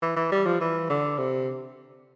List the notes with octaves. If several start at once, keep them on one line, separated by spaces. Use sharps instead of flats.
E3
E3
G3
F3
E3
D3
C3